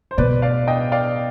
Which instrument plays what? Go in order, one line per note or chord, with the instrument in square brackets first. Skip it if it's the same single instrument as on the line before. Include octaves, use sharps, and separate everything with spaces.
[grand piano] C5
[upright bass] B2 [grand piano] B4 D5
[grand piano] D5 F5
D#5 G5
D5 F5